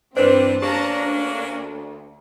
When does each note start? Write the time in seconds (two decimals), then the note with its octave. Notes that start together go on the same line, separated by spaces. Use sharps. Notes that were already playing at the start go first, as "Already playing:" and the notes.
0.17 G2 E3 G3 C4 D4 B4 C5
0.62 A#3 C#4 D4 G4 A5 A#5
1.02 D2